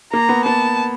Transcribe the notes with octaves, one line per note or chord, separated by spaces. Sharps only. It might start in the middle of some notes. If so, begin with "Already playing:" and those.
A#3 A#5
B3
B3 A5